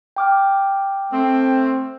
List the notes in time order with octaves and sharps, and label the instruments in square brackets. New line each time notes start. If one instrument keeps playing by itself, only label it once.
[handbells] G5 D6 F6
[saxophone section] A3 C4